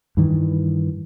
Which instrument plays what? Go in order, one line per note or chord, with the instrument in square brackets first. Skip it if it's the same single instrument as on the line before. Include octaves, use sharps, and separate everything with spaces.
[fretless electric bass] G2 D#3 E3